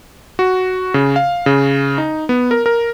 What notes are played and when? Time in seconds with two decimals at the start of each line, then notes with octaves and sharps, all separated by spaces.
0.39 F#4
0.94 C#3
1.16 F5
1.46 C#3
1.98 D#4
2.29 B3
2.51 A#4
2.66 A#4